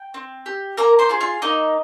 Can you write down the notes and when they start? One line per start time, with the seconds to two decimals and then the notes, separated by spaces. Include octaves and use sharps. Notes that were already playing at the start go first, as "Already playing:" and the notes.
Already playing: G5
0.14 C4
0.46 G4
0.77 A#3 A#4 A#5
0.99 C5 C6
1.09 F4 G#4
1.21 F4 F5
1.42 A#3 D#4 D#5